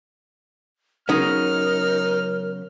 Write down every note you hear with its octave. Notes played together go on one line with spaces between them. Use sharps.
C#3 F#3 B3 D#4 A#4 F6